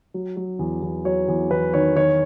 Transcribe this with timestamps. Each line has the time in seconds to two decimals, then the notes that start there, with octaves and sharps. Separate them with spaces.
0.14 F#3
0.37 F#3
0.59 E2
0.82 E2
1.05 F#3 C#5
1.28 E2
1.51 E2 B4
1.74 D#3 C#5
1.96 D#3 C#5